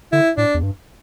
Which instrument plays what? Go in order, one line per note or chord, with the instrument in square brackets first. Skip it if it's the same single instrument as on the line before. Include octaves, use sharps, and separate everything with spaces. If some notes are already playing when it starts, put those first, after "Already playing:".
[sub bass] D3 [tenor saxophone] E4
[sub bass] A2 [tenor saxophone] D4
[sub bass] E2
G2